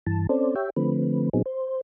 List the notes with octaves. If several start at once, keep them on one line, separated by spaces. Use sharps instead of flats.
G2 E3 A5
C4 C#4 A4 C5 D5
G4 C#5 E5 G5
D3 F3 A3 C4 B4
A#2 F#3 B3 C4 D#4 G#4
C5